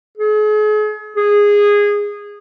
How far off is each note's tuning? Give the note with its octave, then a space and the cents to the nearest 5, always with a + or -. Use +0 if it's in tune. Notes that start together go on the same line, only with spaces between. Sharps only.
G#4 +40
G#4 -15